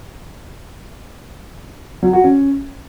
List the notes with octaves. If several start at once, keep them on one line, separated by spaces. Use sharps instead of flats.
F#3
F#4
C#4